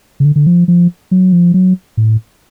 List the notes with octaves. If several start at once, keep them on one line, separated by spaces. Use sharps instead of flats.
C#3
D3
D3
F3
F3
F#3
F3
F#3
A2